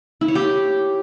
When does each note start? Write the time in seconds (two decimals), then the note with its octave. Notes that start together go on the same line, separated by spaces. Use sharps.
0.21 E4
0.28 C#5
0.35 G4